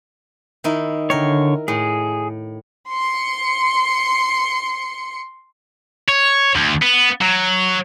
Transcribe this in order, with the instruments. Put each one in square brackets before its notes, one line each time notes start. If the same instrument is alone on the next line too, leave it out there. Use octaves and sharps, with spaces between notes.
[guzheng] D#3 D#4 E4
[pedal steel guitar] D3 C#5 [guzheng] A#4 G5
[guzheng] A2 [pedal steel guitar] G#4
[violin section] C6 C#7
[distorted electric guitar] C#5
D2
B3
F#3